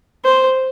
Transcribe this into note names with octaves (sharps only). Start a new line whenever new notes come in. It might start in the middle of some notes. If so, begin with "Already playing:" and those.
C5